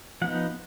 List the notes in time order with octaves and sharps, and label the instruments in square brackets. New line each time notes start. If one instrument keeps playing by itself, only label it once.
[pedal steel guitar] F3 B3 D#4 F#5